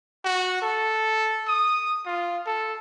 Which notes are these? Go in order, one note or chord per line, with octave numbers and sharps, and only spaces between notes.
F#4
A4
D#6
F4
A4